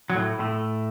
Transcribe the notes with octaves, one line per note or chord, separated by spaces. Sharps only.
F#3
A2 A3
A2 A3